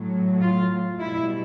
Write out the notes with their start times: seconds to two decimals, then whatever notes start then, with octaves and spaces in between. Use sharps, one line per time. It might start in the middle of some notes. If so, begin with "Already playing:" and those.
Already playing: A2 F#3
0.40 F4
0.99 B2 G3 E4